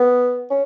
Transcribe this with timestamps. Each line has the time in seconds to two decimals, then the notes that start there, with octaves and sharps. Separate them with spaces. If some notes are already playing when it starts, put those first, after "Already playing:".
Already playing: B3
0.50 C#4